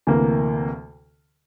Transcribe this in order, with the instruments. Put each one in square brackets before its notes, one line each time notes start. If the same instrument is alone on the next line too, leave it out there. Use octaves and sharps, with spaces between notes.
[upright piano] D2 C3 E3 A#3